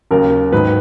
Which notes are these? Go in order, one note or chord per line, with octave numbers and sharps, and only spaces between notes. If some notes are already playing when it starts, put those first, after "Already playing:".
D#2 C#3 F#3 A#3 A#4
G#2 D#3 F#3 B4